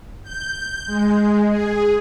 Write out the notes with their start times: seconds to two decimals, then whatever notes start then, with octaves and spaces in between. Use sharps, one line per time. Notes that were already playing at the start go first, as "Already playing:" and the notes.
0.23 G6
0.86 G#3
1.47 G#4